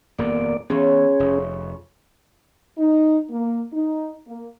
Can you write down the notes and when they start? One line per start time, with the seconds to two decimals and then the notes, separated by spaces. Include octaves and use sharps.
0.19 D#1 F2 A#3 B3 D5
0.70 C#3 E3 B3 C#4 G#4 C#5 C6
1.20 F1
2.78 D#4
3.30 A#3
3.73 D#4
4.28 A#3